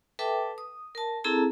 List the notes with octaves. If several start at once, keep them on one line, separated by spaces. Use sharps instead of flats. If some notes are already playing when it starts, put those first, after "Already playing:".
A4 B4 E5 G5 A5 D6
D#6
A#4 A5
C4 E4 G#4 A4 A5 A#5